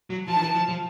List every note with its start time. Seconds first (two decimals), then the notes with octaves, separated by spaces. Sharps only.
0.10 F#3
0.27 F3 A5
0.36 D#3
0.41 E3
0.55 F3
0.69 F3